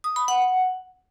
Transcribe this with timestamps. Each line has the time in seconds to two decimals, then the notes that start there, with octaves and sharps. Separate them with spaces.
0.04 D#6
0.16 B5
0.28 F#5